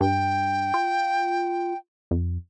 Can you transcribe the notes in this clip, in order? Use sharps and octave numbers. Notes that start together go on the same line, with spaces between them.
G2 G5
F4
F2